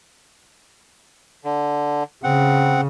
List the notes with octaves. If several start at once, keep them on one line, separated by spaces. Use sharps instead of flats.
D3
C#3 C4 F#5